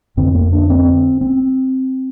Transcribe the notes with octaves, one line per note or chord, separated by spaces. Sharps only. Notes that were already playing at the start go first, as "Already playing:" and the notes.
F2 D3 C4
A#3
D4
C4
C4